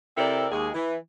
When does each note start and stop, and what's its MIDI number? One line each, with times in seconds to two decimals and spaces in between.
0.17 0.46 48
0.17 0.46 60
0.17 0.46 64
0.17 0.46 69
0.17 0.46 70
0.17 0.46 74
0.50 0.69 39
0.50 0.69 56
0.50 0.69 68
0.75 0.95 52